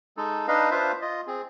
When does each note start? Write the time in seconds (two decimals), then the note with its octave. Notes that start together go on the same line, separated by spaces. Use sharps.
0.17 G#3 D#4 A4
0.48 D4 D#4 B4 D#5 F5
0.71 D4 F4 B4 C5 E5 F5
1.02 F4 D#5
1.27 C4 G#4